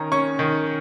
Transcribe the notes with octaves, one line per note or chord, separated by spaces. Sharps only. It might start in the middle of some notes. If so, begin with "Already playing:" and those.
Already playing: D#3 C#4 A#5
C#4 C#6
D#3